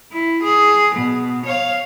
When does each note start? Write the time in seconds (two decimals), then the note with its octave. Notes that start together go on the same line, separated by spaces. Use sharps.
0.12 E4
0.43 G#4
0.95 B2
1.45 C#5 F5